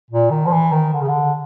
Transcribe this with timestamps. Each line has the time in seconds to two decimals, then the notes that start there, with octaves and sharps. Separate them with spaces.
0.11 A#2
0.30 D#3
0.46 F3
0.52 E3
0.72 D#3
0.93 D3
1.01 C#3
1.08 D3